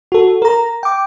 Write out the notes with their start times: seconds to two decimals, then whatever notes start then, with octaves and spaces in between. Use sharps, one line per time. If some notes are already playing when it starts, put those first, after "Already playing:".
0.12 F#4 A4
0.42 A#4 A#5
0.83 G5 D6